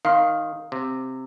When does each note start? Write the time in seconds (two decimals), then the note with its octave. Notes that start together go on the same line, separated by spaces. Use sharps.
0.05 D#3 F5 C6 F6
0.72 C3